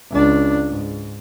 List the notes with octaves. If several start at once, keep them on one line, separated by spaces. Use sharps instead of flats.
C#2 D4
G#2